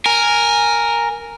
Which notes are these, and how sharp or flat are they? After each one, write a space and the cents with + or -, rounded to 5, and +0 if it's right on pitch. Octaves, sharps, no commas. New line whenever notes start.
A#4 +0 G#5 +0